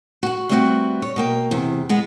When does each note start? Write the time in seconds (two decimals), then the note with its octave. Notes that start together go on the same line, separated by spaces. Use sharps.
0.23 F#4 F#5
0.49 G3 A3 B3 C4 D#4 F#4
1.02 C#5
1.16 B2 A#3 G5
1.51 E2 C3
1.89 G#3 B3